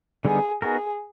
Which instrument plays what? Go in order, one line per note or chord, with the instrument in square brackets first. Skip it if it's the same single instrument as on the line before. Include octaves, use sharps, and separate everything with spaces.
[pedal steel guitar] D3 G3 B3 D#4 [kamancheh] G#4
[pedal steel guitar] B3 D#4 F#4 A#4 [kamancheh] G#4